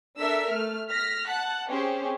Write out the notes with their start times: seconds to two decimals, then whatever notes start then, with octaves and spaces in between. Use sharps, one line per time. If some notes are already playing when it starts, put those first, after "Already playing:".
0.19 D4 A4 A#4 E5 E6 B6
0.51 A3 F6
0.91 F6 A#6 B6
1.27 F#5 A5 F#6
1.68 C4 C#4 G4 G#4 C5